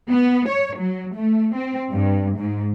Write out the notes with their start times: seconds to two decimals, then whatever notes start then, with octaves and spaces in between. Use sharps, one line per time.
0.10 B3
0.49 C#5
0.78 F#3
1.16 A3
1.55 C4
1.93 G2
2.38 G#2